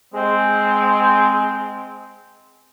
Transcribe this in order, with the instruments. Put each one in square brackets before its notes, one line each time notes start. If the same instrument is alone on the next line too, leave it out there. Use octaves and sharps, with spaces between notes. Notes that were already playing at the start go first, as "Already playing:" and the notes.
[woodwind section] G#3 C4